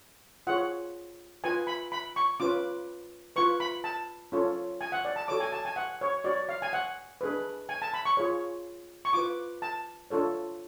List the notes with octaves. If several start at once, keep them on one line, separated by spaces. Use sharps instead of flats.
F4 G#4 C#5 F#5
F4 B4 G#5
B5
B5
C#6
C#4 F4 B4 D6
F4 B4 C#6
B5
A5
C#4 F4 A4 C#5
G#5
F#5
D5
A5
F#4 A4 C#5 D6
G#5
A5
G#5
F#5
C#5
F#4 C#5 D5
F5
G#5
F#5
D4 G#4 B4
G#5
A5
B5
C#6
F4 G#4 C#5
C#6
F4 B4 D6
A5
D4 F4 A4 C#5